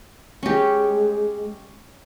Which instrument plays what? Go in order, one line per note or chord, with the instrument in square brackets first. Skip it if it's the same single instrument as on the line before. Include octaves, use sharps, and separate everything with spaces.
[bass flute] G#3 [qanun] C#4 G4